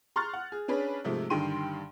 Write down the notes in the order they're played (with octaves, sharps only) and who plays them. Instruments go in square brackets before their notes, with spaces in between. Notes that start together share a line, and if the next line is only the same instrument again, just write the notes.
[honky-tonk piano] A#5 C6 C#6 F6 F#6 A6
F#5
G#4
C#4 D4 G#4 B4
G#2 C3 F3 A3
G2 D3 D#3 G5 C6 D#7